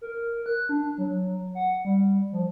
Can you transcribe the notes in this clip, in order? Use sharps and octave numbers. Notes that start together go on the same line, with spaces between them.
A#4
F#6
D4
F#3
F#5
G3
F3